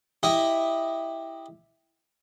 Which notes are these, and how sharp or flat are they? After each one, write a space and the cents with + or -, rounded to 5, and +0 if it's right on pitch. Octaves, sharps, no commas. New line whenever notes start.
E4 +0 G4 +10 D#5 +0